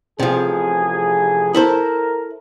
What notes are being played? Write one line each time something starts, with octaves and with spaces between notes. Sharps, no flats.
A1 C3 F3 G#4
E4 A4 A#4 C5